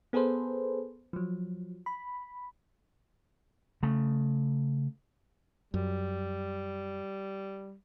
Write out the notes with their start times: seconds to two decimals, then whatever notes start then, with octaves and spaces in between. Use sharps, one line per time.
0.13 B3 G#4 A4 B4 C5
1.13 F3 F#3
1.86 B5
3.83 C#3 A3
5.74 F#2 G3